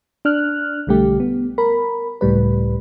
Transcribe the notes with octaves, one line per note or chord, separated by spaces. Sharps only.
D4 F6 F#6
B1 D3 G3 A3 G4
B3
A#4 B5
C#2 A2 G3 B4